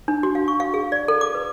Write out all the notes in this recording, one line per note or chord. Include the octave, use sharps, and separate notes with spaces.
D4
F#4
F5
C#6
F5
G#4
D5
A4
D6
B4